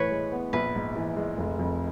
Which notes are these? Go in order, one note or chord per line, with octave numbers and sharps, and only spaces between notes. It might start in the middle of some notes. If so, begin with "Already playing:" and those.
Already playing: A2 E3 B4 C#5
G#3
B3
A#1 B4
G#2
E3
G#3
F1
F2